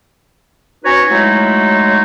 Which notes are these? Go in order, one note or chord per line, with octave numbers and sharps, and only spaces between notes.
C#4 D#4 F#4 B4 C#5
F#3 G#3 A3 D#4 E4